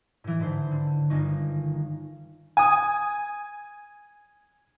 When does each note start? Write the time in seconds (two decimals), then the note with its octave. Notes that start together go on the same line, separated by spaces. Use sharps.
0.24 A2 E3
0.40 G#2 D3 B4 C5
0.71 D3
1.10 G1 D#3 D#4 C#6
2.57 G#5 D#6